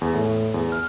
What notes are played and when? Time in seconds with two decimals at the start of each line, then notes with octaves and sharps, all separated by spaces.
0.01 E2
0.14 A2
0.54 E2
0.72 F6